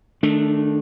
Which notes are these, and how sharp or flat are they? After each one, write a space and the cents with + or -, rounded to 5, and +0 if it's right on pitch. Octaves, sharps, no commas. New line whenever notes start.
D#3 -30 A3 -15 D4 +0